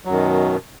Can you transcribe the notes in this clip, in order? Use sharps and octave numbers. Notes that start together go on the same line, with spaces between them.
F#2 B2 D#3 F#3